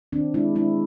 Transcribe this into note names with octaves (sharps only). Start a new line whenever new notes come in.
D#3 C4 D4
G#3 D4 E4
G#3 D4 E4